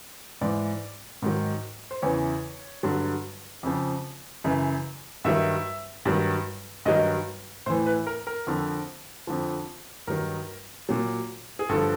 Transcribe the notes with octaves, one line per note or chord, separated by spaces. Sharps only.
G#2 E3 D5
G#2 D#3 F#3
C5
E2 C#3 E3 C#5
G2 D3 F#3
F2 C#3 F3
F#2 C#3 E3
G2 D#3 F#3 E5
G2 D#3 F#3
G2 D#3 F#3 D#5
A2 E3 C5
B4
A#4
A#4
F2 D3 F3
F2 D3 F3
G2 D#3 F#3 A#4
A#2 F#3
G#4
G2 D3 F3 A4